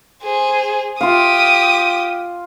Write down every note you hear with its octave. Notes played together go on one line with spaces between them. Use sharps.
G#4 C5
F4 G4 F5 D#6